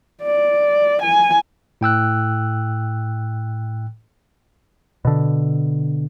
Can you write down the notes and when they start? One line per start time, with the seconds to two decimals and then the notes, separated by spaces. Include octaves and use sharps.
0.23 D5
1.02 G#5
1.81 A2 G5 E6 F#6
5.05 B2 D3